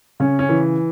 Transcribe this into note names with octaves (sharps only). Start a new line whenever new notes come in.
C#3 C#4
C#4
E3